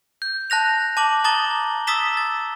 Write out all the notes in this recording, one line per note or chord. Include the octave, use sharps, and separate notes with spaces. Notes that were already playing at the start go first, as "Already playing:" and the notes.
G6
A5 F#6 A#6 F7
A5 D6 F#7
A5 A#5 D#6 A6 G7
D#6 E6 A6 B6 E7 G7
A6